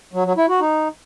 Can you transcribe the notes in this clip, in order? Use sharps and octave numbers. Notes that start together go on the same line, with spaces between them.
F#3
F#3
E4
F#4
D#4